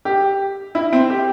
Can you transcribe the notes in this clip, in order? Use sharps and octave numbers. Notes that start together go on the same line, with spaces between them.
G4
E4
C4
G4